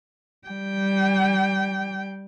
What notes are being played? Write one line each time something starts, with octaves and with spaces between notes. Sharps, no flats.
G3 G5